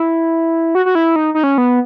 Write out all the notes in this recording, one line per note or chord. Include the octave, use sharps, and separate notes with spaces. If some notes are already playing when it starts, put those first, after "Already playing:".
Already playing: E4
F#4
F#4
E4
D#4
D#4
C#4
B3